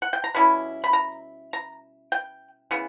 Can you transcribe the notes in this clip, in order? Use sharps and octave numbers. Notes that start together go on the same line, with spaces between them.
F#5
G5
A#5
B2 G3 C#4 E4 B5
B5
A#5
A#5
G5
C#3 E3 B3